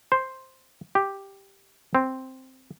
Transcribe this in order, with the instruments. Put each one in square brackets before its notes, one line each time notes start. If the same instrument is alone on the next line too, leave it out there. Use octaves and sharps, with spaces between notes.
[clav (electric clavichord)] C5
G4
C4